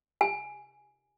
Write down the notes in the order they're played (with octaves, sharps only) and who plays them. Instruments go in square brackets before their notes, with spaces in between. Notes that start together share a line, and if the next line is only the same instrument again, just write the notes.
[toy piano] G#5